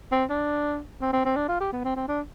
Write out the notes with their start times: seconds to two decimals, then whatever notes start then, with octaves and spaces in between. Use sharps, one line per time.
0.12 C4
0.29 D4
1.01 C4
1.13 C4
1.25 C4
1.36 D4
1.48 F4
1.60 G4
1.73 B3
1.85 C4
1.96 C4
2.08 D4